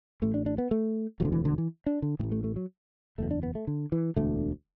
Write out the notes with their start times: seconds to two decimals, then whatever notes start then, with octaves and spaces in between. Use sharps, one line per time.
0.22 A1 A2 A3
0.34 D4
0.46 D4
0.58 B3
0.71 A3
1.20 E1 D2 D3 F#3
1.32 E3
1.45 D3
1.58 E3
1.86 D4
2.02 D3
2.19 A2 E3
2.23 A1
2.32 A3
2.44 A3
2.56 F#3
3.18 F#1 E2 B2 A3
3.31 D4
3.43 B3
3.55 A3
3.67 D3
3.92 E3
4.16 E1 D2 D3 A3